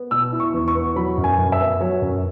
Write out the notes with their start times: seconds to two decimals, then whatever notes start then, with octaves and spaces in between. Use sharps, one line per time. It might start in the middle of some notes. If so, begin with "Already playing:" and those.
Already playing: B3
0.11 B2 E6
0.32 E4
0.40 C#6
0.54 E2
0.68 C#6
0.75 B3
0.96 F#3 B5
1.17 F#2
1.24 G#5
1.38 F#2
1.52 E5
1.60 B3
1.81 F#3 C#5
2.02 F#2